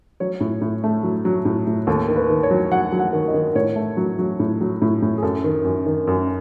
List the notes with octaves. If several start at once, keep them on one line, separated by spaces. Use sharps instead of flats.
F#3 C#5
A2
A2
A3
F#3
F#3
A2
A2
D#2 A4
D#3
B4
D#3
C#5
F#3
F#3 F#5
F#3
F#5
D#3
D#5
D#3
A2 C#5
A3
F#3
F#3
A2
F#3
A2
A2
G#4
F#2 A4
D#3
F#2
D#3
F#2